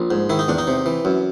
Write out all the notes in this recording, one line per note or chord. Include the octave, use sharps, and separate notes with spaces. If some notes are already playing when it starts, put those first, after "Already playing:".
Already playing: A#1
G#2
D#3 E4
D#4
E2 D4
D#4
C3
E3
F#2